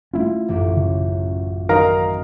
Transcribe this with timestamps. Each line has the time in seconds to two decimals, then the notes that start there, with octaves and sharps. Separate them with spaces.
0.13 A3 A#3 C#4 E4 F4
0.48 A1 F#2 G4
0.77 C#3
1.69 D#3 F#3 A#4 D#5 F5 A#5